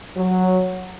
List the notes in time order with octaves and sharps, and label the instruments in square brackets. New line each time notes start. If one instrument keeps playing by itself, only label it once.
[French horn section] F#3